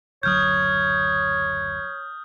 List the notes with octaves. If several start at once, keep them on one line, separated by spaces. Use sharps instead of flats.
F#1 D2 F#3 C#5 D#6 F6 G6